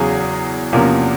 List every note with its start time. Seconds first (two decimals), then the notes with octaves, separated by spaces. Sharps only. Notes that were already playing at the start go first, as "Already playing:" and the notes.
Already playing: E2 C#3 F#3 G#4
0.73 E2 C3 F3 A#3 C#4